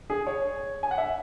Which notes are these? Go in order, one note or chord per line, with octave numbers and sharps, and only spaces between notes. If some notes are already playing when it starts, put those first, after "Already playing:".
G#4
C#5
G#5
F#5
E5